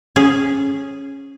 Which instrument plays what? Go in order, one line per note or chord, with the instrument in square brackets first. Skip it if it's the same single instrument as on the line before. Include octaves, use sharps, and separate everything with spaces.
[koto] C#4 G#4